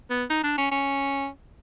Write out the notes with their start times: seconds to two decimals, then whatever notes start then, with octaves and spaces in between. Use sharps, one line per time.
0.10 B3
0.30 D#4
0.44 D4
0.58 C#4
0.71 C#4